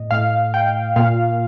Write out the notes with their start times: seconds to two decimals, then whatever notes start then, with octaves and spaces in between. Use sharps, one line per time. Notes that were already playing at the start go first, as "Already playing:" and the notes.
Already playing: A2 D#5
0.11 A2 F5
0.54 G5
0.96 A#2 F5